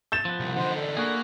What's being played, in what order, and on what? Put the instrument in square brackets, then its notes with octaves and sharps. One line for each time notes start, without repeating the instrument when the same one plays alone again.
[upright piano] G6 A6 E7
[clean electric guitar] F3 B3
[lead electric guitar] C2
[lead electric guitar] D3 D#4 [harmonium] C5 F#5
[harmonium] D4 A4
[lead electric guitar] A#3 [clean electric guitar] E4 F#4 G#4